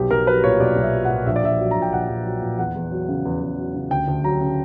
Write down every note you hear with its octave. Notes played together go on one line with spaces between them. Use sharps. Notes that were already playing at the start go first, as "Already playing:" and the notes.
Already playing: B1 G4
B1 A#4
F#3 B4
A#2 C#5
B1 D5
B1
E5
F#3
F#5
A#2
A#1 E5
D5
A#1 E5
F#3
A#2 A#5
G5
A#1 F#5
A#1
F#3
A#2
E2 F#5
E2
F#3
C#3
E2
E2
F#3
C#3
D2 G5
D2
F#3 A#5
C#3